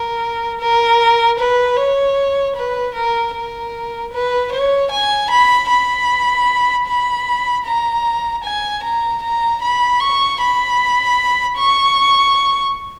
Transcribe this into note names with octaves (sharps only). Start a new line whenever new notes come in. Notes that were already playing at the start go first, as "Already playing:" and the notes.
Already playing: A#4
A#4
B4
C#5
B4
A#4
A#4
B4
C#5
G#5
B5
B5
B5
A#5
G#5
A#5
A#5
B5
C#6
B5
C#6